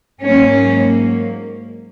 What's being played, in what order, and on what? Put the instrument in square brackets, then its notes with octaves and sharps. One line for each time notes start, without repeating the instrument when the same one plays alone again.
[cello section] G#2 F#3 A#3 C#4